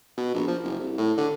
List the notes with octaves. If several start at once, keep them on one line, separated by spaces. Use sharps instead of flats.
B2
A#1
F3
F#1
C2
A2
D3